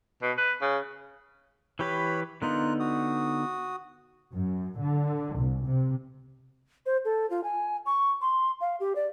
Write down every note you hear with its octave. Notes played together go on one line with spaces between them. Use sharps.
B2
B4
C#3
E3 G4 B4 C#5 B5
D3 B3 D#4 F4 A#4 F#6
F#4 D#6
F#2
D3
C2
C3
C5
A4
F4
G#5
C#6
C6
F5
G4
D5